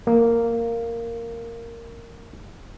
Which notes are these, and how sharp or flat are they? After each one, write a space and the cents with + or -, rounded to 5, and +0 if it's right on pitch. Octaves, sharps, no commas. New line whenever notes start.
A#3 -10